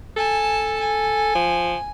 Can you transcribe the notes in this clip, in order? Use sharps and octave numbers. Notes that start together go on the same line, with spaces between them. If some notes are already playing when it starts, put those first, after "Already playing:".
A4 G#5 A5
G#5
F3